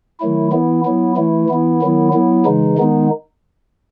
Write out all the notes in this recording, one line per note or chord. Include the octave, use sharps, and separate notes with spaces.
D#3 F#3 A3 E4
E3 B3 E4
F#3 B3 E4
E3 A3 E4
E3 B3 E4
D#3 F#3 B3 E4
F#3 B3 E4
C#3 E3 G#3 D#4
D#3 G#3 B3 D#4